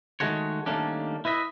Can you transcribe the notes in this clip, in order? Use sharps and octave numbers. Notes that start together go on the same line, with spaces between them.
D#3 G#3 A3 F#4 C#5
D#3 G3 A3 A#3 C#4 D4
E4 B4 D#5 E5